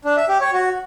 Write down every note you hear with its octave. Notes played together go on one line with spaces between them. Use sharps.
D4
E5
G4
C#5
F#4